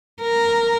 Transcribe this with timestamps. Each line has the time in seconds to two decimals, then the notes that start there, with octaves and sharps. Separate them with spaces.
0.22 A#4